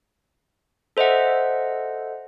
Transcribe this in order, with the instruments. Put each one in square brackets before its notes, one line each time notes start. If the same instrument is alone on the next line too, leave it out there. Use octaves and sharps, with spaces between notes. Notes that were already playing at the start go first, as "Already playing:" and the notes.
[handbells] A4 C5 D#5 E5 F#5